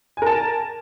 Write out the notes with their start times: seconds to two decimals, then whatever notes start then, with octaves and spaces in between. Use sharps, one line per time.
0.17 G#5
0.22 A#4
0.27 A5